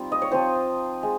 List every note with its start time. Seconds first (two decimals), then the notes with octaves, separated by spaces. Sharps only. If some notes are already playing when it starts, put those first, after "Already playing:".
Already playing: G3 C4 D#4 F4
0.12 D#5
0.22 C#5
0.31 F3 C4 F4 C5
1.03 G#3